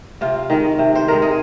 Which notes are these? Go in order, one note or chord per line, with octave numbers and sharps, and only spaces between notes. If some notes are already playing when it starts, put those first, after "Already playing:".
C3 F4
D#3 G#3
C3
C5
D#3 G#3 A#4
G#4